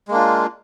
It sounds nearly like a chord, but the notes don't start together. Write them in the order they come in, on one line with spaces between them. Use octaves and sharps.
G#3 A#3 D4 F4